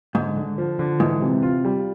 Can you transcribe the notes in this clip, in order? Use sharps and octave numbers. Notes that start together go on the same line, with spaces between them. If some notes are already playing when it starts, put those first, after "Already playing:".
G#2 D3
D3
F3
D3
G#2 E3
C3
F4
G3